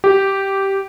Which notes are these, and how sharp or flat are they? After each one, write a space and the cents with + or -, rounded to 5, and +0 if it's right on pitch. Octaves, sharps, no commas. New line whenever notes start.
G4 -10